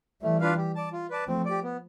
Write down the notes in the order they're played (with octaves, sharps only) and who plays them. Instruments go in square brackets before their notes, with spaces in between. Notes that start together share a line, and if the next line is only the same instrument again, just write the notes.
[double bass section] E3 G3 [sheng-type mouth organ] A3
[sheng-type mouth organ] D4 F4 B4 F5
G4
D5 A5
F4
B4 D5 A5
[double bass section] F3 A3 [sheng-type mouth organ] C4
[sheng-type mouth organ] G4 D5
B3